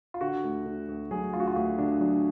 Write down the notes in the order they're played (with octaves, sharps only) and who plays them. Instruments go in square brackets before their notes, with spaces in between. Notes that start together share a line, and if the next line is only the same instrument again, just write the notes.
[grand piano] F4
D3 F#4
D2
D3
D2
F#3 G#4
D2 F4
F#4
F4
D2
D3 D4
F#3 D4